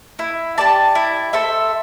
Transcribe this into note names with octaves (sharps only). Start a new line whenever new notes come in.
E4
G4 D5 A5
E4
A4 C5 E5